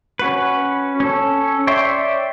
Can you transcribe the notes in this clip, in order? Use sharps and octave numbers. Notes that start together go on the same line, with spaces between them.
C#4 F#4 B4
C#4 A4
C#5 D5 E5 G5 C6